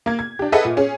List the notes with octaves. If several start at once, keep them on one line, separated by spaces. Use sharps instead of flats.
A#3 G#6
G#6
D4 G4
G#4 A4 B4 D#5 E5 F#5
A#2
C#4 G#4